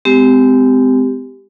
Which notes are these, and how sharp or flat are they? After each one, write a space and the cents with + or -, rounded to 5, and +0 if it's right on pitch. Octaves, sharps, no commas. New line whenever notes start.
G#3 +0 C4 -40 G4 -5